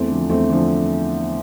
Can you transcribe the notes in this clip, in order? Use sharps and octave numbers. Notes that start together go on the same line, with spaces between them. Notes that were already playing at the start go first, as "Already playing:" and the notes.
Already playing: E2 A3 C4
D3 F3
E2 A3 C4
D3 F3